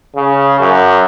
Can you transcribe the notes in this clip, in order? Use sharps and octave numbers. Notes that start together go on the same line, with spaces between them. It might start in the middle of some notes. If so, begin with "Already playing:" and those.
C#3
F#2